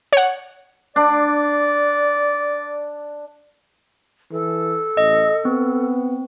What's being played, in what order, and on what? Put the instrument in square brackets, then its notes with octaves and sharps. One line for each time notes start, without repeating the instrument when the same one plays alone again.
[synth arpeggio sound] C#5 F#5
[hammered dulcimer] D4 [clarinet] D5
[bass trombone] E3 [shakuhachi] A4
[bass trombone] A1 [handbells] D#5
[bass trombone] B3 [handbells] C4